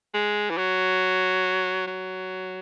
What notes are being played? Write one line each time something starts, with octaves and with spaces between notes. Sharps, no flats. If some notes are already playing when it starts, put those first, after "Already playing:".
G#3
E3
F#3
F#3